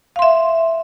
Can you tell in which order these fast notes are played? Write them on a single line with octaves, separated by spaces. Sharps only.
F5 C6 E5